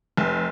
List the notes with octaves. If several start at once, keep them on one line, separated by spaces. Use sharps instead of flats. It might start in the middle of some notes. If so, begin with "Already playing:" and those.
F1